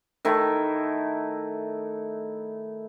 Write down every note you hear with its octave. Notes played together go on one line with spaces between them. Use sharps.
D#3 A3 E4